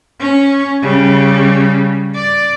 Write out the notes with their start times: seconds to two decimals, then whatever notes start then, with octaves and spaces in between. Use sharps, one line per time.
0.20 C#4
0.82 C#3 G3
2.15 D5